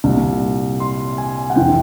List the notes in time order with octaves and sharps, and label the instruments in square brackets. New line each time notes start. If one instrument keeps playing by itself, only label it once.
[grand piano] C2 A#2
C6
G#5
F#5
F2 C3 E3 G5